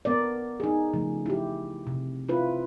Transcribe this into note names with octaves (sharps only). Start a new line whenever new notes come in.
B3 A#4 D5
D#4 G#4
C#3 F3 A3
E4 G4
C3
C4 E4 F4 B4